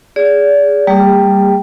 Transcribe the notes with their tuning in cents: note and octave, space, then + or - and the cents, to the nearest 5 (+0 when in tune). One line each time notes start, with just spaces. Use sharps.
G#4 -10 D5 -35
G3 +0 A#3 -35 G4 +40